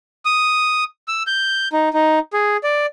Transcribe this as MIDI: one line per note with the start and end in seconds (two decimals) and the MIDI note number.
0.25 0.84 87
1.08 1.23 88
1.27 1.68 91
1.73 1.89 63
1.94 2.19 63
2.33 2.57 68
2.64 2.86 74